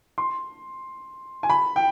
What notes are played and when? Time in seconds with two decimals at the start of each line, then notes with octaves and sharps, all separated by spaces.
0.18 C6
1.43 G#5
1.50 B5
1.76 G5